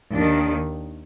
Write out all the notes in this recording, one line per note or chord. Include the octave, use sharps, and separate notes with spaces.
D#2 D#3 D4